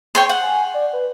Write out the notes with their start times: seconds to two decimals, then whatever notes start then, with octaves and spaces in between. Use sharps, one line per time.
0.15 C#5 G5 C6
0.29 F#5
0.42 G#5
0.74 D5
0.93 B4